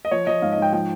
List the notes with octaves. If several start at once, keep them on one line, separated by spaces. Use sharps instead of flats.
D#5
F3 C#5
F3 D#5
G#2 F5
D#5
G#2 G5
F3 G5